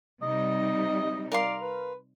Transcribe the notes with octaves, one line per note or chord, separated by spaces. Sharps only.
C3 G3 D#4 D#5
A#4 D5 F5 C6
B4